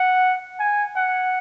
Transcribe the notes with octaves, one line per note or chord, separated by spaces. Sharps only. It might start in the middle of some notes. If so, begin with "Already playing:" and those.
Already playing: F#5
G#5
F#5